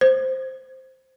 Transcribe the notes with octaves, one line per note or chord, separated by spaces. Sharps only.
C5